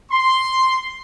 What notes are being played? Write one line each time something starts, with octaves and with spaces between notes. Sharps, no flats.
C6